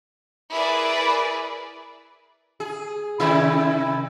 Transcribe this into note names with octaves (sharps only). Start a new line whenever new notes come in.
E4 G#4 A#4 B4 D5
G#4
C3 D#3 E4